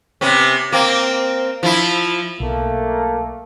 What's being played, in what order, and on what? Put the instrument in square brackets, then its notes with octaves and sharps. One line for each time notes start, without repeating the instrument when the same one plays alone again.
[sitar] C3 B3 C#4
A#3 C4
F3 E4
[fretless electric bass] B1 [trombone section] A3 A#3